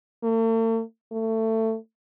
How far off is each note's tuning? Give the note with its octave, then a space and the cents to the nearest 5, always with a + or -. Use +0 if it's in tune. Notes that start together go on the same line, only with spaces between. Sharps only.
A3 +45
A3 +20